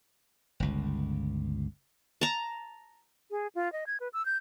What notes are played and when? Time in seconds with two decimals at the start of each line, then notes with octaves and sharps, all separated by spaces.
0.60 G1 C#2
2.21 A5 A#5
3.31 G#4
3.55 F4
3.73 D#5
3.87 G#6
4.00 B4
4.13 E6
4.26 G6